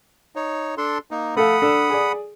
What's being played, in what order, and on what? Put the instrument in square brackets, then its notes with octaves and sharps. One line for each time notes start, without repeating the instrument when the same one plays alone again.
[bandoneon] D#4 C#5
D4 A4 C6
A#3 D#4
[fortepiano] A3 A4 F5 [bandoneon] F#5 B5 D#6
[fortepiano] D4 A4
G#4 D5